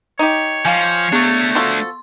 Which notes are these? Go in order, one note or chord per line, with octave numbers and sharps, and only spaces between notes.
D#4 G4 C#5
F3 F5 G#5
A3 B3 D4 C#6
F3 F#4 A4 C6